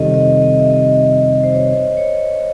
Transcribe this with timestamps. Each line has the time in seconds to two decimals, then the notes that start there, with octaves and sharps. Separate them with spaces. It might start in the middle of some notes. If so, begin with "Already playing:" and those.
Already playing: F2 C3 D#3 G3 A4 D#5
0.14 D#5
0.42 D#5
0.59 E5
0.70 D#5
1.44 C5
1.55 C#5
1.97 C#5